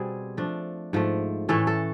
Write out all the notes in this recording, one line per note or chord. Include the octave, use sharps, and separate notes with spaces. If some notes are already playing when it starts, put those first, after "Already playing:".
Already playing: B2 G3 C4 G#4
F3 A3 D4
G#2 F3 A3
A2 E3 A3 C#4 A4
A4